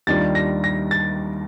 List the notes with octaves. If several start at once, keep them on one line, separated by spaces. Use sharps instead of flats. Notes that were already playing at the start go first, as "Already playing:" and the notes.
D#2 D#3 G3 D4 F4 A6
A#6
A#6
A6